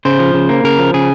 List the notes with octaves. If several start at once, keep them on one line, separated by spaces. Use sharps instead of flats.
C#3 C5
F3
C#3
A#3
C#3 A#4
F3
C#3 G#4